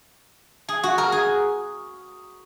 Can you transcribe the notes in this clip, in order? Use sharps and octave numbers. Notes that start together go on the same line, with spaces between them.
G#4
F#4
A#4
G#4